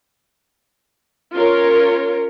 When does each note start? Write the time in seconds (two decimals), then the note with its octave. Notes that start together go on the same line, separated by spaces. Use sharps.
1.35 C#4 F4 A#4 C#5